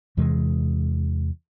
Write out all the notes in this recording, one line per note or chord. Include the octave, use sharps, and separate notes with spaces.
E2 C3 E3 G#3